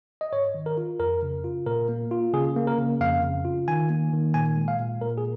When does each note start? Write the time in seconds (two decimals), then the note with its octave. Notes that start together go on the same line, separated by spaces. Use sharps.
0.21 D#5
0.32 G#2 C#5
0.54 D#3
0.66 A#4
0.77 F4
1.00 F2 A#4
1.23 C#3
1.44 F4
1.66 A#2 A#4
1.89 A#3
2.11 F4
2.34 C#3 G#4
2.56 A#3
2.67 A#4
2.78 C#3
3.01 F2 F5
3.23 C#3
3.45 F4
3.68 D#3 G#5
3.90 A#3
4.13 D#3
4.34 A#2 G#5
4.56 G#3
4.68 F5
4.79 A#2
5.02 A#2 A#4
5.18 G#4